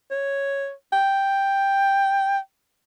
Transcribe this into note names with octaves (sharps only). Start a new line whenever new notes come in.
C#5
G5